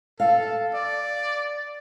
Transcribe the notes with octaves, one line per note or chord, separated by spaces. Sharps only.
A4 F5
D5